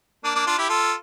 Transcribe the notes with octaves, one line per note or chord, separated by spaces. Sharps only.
A#3 D4
A#3 D4
D4 F4
E4 G4
F4 A4